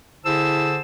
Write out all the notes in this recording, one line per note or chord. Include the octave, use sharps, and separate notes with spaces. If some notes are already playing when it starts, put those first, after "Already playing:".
D3 E4 G#4 C5 A5 E6